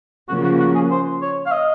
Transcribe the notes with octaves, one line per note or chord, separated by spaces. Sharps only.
C#3 F3 A#3 F#4
F#4
F#4
G#4
C5
C#5
F5
D#5